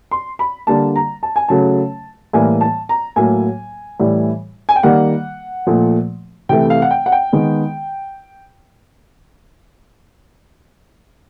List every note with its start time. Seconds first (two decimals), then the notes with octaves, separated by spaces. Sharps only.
0.11 C6
0.39 B5
0.67 D3 G3 A#3 A5
0.96 A#5
1.23 A5
1.36 G#5
1.48 C#3 F#3 A3 A5
2.33 A2 E3 G3 A#3 G#5
2.61 A5
2.89 A#5
3.16 A2 F#3 A#3 G#5
3.99 A2 E3 G3
4.69 G#5
4.76 G5
4.83 D#3 G3 A#3 F#5
5.67 A#2 F3 A3
6.49 C3 E3 A3 G5
6.70 F5
6.82 F#5
6.91 G5
7.06 F#5
7.12 G5
7.32 D#3 G#3 B3